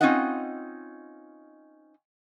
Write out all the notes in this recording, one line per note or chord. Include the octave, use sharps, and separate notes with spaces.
C4 C#4 D#4 F4 D#5 F#5